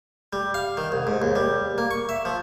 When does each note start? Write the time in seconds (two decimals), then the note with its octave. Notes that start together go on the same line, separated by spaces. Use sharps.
0.33 G3
0.54 F5
0.77 D#3
0.92 C2
1.07 G#2
1.22 D#2
1.36 G3
1.78 A#3
1.91 C#6
2.09 E5
2.25 F3